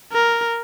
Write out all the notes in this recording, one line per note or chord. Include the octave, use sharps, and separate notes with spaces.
A#4